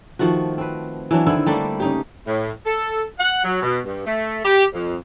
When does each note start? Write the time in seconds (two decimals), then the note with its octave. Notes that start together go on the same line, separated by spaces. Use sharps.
0.19 D#3 F3 A3 F#4
0.58 C4 B4
1.11 E3 F#3 D4
1.26 D3 D#3 C4 E4
1.46 G3 A3 A#3 D4
1.80 C#3 D#4 G4
2.26 A2
2.65 A4
3.19 F#5
3.44 F#3
3.62 B2
3.85 G2
4.06 A3
4.44 G4
4.73 F2